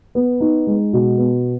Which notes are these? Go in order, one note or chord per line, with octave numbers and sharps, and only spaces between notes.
B3
D#4
G#3
B2
B3